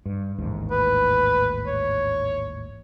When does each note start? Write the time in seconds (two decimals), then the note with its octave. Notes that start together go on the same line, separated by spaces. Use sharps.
0.06 G2
0.38 A1 D#2 G#2
0.71 B4
1.67 C#5